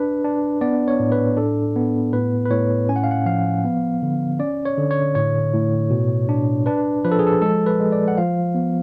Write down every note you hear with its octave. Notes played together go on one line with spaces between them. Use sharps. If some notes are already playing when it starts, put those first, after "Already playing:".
Already playing: D4 B4
D4
B3 D5
C#5
A2
B4
D4 A4
B3
A2 B4
B4
A2 C#5
C#4 G#5
F#5
F5
F#5
F3 F5
B3
D3
C#4 D5
C#5
D3
C#5
A2 C#5
A2
B2
D4
D4 B4
F3 B4
A4
G#4
A4
G#3 A4
B4
G#3
D5
F#5
F3 F5
B3